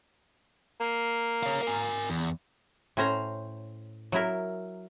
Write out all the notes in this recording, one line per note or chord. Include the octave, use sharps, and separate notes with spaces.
A#3
C#5 F5
A#4 G#5
E2
A2 C#4 C5 A#5
F#3 E4 A#4